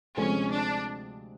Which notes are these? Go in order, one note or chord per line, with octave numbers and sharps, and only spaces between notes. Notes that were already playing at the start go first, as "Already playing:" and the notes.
D2 C3 F3 G#3 C4 C#4
D4